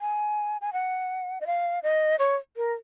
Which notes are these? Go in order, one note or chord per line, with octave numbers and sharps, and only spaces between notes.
G#5
G#5
F#5
D#5
F5
D#5
C#5
A#4